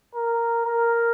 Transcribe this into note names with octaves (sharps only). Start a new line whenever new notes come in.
A#4
A#4